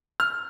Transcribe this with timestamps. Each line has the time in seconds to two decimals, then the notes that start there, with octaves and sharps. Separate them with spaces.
0.20 F6